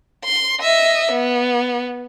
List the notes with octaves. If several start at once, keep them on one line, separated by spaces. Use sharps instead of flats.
C6
D#5 E5
B3